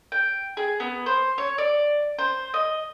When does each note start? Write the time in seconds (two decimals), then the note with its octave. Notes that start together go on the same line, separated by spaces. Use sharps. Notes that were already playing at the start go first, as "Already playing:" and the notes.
0.12 G5
0.57 G#4
0.80 B3
1.06 C5
1.38 C#5
1.58 D5
2.19 C5
2.54 D#5